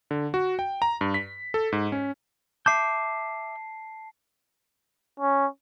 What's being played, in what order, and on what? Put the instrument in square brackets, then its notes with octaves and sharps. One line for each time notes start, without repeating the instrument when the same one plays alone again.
[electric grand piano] D3
F#4
G5
A#5
G2
B6
A4
G#2
C#4
[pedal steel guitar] E5 D6 G6 [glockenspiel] A5 C7
[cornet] C#4